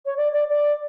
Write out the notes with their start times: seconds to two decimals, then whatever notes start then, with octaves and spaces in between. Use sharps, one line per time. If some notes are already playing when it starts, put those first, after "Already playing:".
0.06 C#5
0.17 D5
0.33 D5
0.50 D5